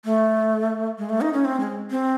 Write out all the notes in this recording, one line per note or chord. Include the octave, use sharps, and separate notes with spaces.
A3
G#3
A3
D#4
C#4
C4
G#3
C4